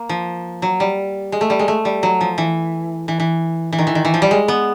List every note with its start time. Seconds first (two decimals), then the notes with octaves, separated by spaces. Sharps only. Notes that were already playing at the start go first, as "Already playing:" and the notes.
Already playing: A#3
0.09 F3
0.62 F#3
0.80 G3
1.32 G#3
1.41 A3
1.50 G3
1.59 G#3
1.68 A3
1.85 G3
2.03 F#3
2.21 F3
2.38 E3
3.08 E3
3.20 E3
3.73 E3
3.78 D#3
3.87 E3
3.95 D#3
4.05 E3
4.14 F3
4.22 G3
4.31 G#3
4.48 B3